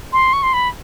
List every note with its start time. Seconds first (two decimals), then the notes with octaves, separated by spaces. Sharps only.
0.13 C6
0.33 C#6
0.43 C6
0.53 B5